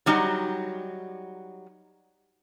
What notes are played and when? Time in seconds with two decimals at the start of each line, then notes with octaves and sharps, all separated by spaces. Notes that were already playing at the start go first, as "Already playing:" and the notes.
0.06 F#3 G3 D#4 F#4